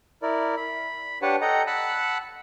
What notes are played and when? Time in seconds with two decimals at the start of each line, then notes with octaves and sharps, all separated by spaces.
0.23 E4 A#4 D5
0.57 B5
1.22 D4 G4 B4 C#5 F#5 A5
1.41 A4 D#5 F#5 G5 A#5
1.67 F#5 A5 B5 E6 F#6